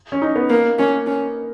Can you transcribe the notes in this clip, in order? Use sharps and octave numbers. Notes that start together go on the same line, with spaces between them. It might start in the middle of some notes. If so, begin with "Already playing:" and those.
C#4
D#4
B3
A#3
A#3 C#4
C#4